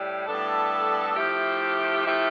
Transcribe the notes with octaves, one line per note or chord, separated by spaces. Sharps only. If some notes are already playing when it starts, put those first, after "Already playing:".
Already playing: A2 G3
A2 G3 B3 D4 A4
F3 A3 E4 G4
F3 A3 E4 G4